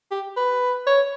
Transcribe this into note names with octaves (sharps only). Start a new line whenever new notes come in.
G4
B4
C#5